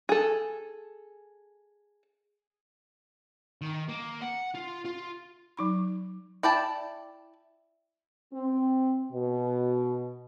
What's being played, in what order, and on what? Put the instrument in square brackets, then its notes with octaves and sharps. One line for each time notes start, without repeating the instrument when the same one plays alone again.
[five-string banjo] G#4 A4
[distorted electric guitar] D#3
A#3
F#5
F4
F4
[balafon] F#3 D#4 B5
[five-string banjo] E4 D5 G5 A5
[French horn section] C4
B2